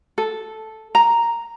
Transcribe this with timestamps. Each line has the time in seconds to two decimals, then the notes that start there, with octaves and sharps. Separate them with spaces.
0.18 A4
0.95 A#5